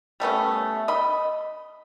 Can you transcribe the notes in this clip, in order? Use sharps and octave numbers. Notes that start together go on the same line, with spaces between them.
G3 A3 B3 C#4
D#5 B5